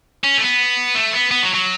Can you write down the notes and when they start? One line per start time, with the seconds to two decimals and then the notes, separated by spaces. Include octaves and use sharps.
0.24 C#4
0.38 A3
0.42 B3
0.95 A3
1.13 B3
1.31 B3
1.43 F#3
1.55 F#3